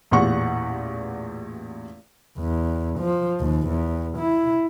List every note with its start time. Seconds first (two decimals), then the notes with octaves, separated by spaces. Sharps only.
0.11 A1 E2 A#2 G4 F#5 C#6
2.38 E2
3.00 F3
3.40 D#2
3.69 E2
4.18 E4